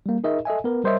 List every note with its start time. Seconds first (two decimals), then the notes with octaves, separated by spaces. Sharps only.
0.06 G3 A#3
0.24 D#4 G#4 A#4 D#5 E5
0.45 A4 D#5 E5 G#5
0.64 B3 A#4 B4
0.84 G3 A#4 C5 C#5 D#5 E5